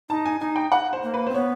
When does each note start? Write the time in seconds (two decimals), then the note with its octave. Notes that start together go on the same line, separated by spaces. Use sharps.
0.09 D#4 A5
0.25 G#5
0.40 D#4 G#5
0.56 G5
0.72 F#5
0.93 C5
1.03 A#3
1.14 B4
1.27 C5
1.30 C4
1.34 B3 C#5